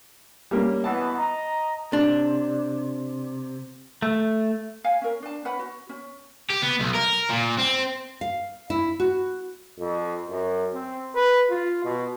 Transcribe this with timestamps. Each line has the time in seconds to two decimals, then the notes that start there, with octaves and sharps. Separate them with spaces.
0.51 G3 A#3 C#4
0.84 B2 E3 B3 A5
1.18 D#5 A#5
1.93 C3 D4
4.02 A3
4.84 F5 G#5
5.02 C#4 A#4
5.22 D4 A5
5.45 C#4 B4 F#5 B5
5.59 F#4
5.89 C#4
6.50 G4
6.62 B3
6.80 B1
6.94 A#4
7.29 A#2
7.59 C4
8.21 F5
8.70 E4
9.00 F#4
9.79 F2
10.29 F#2
10.74 C4
11.15 B4
11.50 F4
11.84 B2